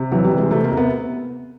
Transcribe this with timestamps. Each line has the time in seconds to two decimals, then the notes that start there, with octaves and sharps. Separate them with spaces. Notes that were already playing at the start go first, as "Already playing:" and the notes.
Already playing: C3
0.12 E3 F#3
0.24 G3
0.31 C3
0.38 G#3
0.51 C3 A3
0.64 A#3
0.71 C3
0.77 B3